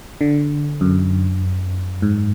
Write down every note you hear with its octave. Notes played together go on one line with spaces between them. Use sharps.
D3
F#2
G#2